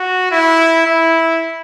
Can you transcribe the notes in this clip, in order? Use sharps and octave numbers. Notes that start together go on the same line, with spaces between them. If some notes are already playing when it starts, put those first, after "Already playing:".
Already playing: F#4
E4
E4